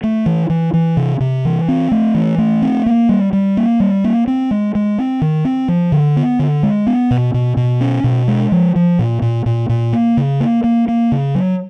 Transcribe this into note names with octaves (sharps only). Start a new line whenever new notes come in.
A3
E3
E3
E3
C3
C3
E3
C4
A3
E3
A3
C4
A#3
G3
G3
A#3
G3
A#3
C4
G#3
G#3
C4
D#3
C4
F3
D3
B3
D3
G#3
B3
B2
B2
B2
C#4
B2
G#3
F3
F3
A#2
A#2
A#2
A#2
A#3
C#3
A#3
A#3
A#3
C#3
F#3